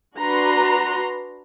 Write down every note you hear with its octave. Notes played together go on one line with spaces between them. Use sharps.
D4 F#4 B4 A#5 C6